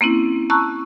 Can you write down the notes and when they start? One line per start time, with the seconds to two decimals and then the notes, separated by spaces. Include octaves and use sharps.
0.01 A#3 C4 C#4 E4
0.50 A5 A#5 C#6 E6 F#6